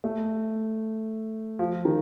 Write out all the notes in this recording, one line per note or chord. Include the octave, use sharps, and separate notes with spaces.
A3
F3
D#3